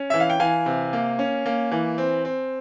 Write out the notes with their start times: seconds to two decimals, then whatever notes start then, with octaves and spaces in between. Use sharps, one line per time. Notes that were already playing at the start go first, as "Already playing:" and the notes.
Already playing: C#4
0.10 E3 E5
0.20 F5
0.30 G5
0.40 E3 F5 G#5
0.66 C3
0.93 A#3
1.19 C#4
1.46 A#3
1.72 E3
1.98 C4
2.25 C4